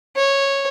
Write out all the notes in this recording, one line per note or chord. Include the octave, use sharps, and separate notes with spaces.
C#5